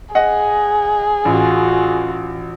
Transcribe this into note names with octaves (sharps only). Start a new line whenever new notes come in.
G#4 D#5 F#5
A1 F4 F#4